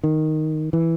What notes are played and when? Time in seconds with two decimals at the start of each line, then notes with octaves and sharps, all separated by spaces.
0.04 D#3
0.73 E3